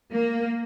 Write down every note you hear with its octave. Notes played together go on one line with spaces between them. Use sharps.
A#3